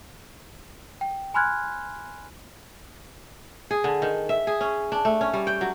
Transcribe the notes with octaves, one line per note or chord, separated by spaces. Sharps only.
G5
G#5 B5 C6 F6 F#6 G#6
G#4
D3
D#3
E5
G#4
C#4
D4
A3
C#4
G3
G5
F#3